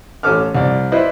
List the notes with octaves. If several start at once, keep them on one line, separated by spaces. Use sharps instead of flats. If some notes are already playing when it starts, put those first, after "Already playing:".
A1 C#4 A4 D6 F6
C2 D5
E4 B4 C5 D5 D#5